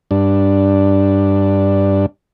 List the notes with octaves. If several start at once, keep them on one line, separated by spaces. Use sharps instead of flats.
G2 D4